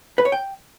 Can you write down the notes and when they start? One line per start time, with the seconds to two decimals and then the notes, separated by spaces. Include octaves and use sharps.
0.18 B4
0.25 C#5
0.32 G5